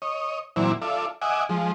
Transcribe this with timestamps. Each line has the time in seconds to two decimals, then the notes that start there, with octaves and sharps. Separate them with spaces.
0.02 C#5 D#5
0.56 A#2 E3 F#3 C4 E4 D5
0.82 F4 A4 D5 E5
1.22 D#5 E5 F#5 G#5 D6
1.49 F3 G#3